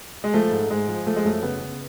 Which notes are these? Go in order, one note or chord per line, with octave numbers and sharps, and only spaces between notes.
G#3
F3 A3
G#2
G#2 G#3
F3
F3 A3
G#3
F#2 A3
C#3 B3
C#3